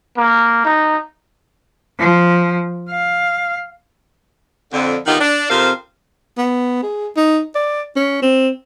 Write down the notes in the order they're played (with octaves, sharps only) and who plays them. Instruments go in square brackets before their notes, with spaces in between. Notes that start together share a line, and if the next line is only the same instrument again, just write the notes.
[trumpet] A#3
D#4
[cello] F3
F5
[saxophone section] F2 D3
D3 D#3 B3 D#4 F4 G4
D4
F2 C3 F3 A#4 C5 F5
[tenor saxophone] B3
G#4
D#4
D5
C#4
C4